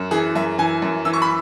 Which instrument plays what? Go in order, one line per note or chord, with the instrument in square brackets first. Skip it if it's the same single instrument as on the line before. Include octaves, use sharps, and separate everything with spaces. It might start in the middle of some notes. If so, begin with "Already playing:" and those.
Already playing: [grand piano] F#2
E3 G#4
F#2 E5
E3 G#5
F#2
E3 E6
C#6
B5